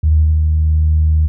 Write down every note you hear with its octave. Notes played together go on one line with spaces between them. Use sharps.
D#2